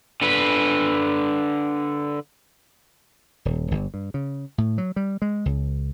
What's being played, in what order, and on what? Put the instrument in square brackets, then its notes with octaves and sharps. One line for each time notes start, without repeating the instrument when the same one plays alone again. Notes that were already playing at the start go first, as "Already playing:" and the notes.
[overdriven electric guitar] D3 B4
[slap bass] D#1
G1
G2
C#3
A2
F#3
G3
G#3
C#2